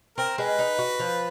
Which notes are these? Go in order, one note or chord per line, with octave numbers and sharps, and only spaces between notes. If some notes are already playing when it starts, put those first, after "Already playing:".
C4 A#4
G#3 B4
D#4
F#4
F3